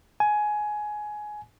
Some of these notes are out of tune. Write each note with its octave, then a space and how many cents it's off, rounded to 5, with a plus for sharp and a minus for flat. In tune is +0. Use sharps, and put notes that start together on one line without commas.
G#5 +15